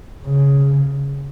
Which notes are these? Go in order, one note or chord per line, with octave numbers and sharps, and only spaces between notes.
C#3